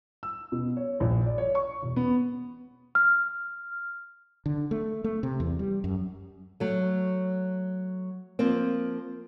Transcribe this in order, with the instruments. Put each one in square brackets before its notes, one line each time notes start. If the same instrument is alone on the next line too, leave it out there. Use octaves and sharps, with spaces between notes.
[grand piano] E6
B2
C#5
A#1
D5
C#5
C#6
E1
B3
[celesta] F6
[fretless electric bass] D3
A3
A3
C3
E2
G3
F#2
[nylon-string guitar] F#3 A3
F3 A#3 C4